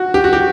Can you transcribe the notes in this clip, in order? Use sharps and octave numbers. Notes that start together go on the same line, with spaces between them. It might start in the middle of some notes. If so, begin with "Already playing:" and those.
Already playing: F#4
G4
F#4
G4